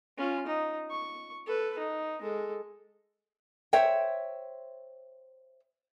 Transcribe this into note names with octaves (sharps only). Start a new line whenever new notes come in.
C#4 F4
D#4
C#6
A4 B4
D#4
G#3 A4
C5 C#5 E5 G5